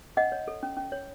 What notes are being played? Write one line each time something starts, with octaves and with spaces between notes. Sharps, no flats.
C#4 D#5 F#5
C#5
A4
C#4
C#4
C#5